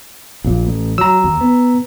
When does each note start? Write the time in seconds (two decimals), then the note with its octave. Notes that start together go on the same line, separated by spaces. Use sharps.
0.44 A#1 A#2
0.65 A1
0.98 F#3 A#5 E6
1.24 D#2
1.41 B3